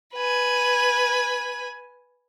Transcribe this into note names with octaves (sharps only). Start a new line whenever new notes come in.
B4 G#5